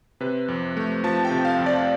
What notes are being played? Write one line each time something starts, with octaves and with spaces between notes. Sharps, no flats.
C3 B4
F2
A3
F3 A5
G5
C3
F5
F2
D5